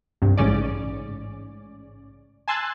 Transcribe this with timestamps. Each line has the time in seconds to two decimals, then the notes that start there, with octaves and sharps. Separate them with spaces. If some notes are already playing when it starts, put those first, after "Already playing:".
0.22 C2 G2
0.37 A1 G#2 C#3 C#4 D5
2.48 G#5 A5 C6 E6 F#6 G#6